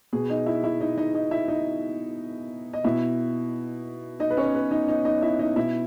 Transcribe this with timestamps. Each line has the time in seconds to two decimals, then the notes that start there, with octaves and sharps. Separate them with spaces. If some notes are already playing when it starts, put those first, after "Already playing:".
0.13 B2 G#4
0.30 D#4 D#5
0.46 E4 E5
0.64 E4 E5
0.81 D#4 D#5
0.98 D#4 D#5
1.14 D#4 D#5
1.31 E4 E5
1.48 D#4 D#5
2.73 D#5
2.84 B2 E4 E5
4.20 D#4 D#5
4.30 B4
4.37 C#4 C#5
4.54 B3 B4
4.71 D#4 D#5
4.88 D#4 D#5
5.05 D#4 D#5
5.22 E4 E5
5.39 D#4 D#5
5.56 B2 E4 E5